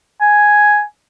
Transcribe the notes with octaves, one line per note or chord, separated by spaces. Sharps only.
G#5